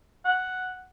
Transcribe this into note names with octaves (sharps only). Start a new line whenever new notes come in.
F#5